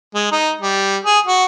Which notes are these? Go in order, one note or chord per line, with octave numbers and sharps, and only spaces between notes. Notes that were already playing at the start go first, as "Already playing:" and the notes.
G#3
D#4
G3
G#4
F#4